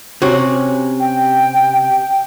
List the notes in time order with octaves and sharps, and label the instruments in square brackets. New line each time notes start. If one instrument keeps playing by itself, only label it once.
[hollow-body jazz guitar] C3 C#4 F#4
[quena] G5